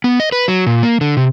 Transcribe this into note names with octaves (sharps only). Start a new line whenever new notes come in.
B3
D#5
B4
F#3
A#2
A#3
D3
C3